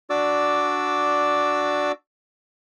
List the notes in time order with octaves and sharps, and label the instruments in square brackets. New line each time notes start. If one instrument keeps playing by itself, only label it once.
[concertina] D4 F#4 D5 D6 E6